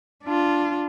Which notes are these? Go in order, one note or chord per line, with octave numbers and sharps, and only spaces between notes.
D4 F4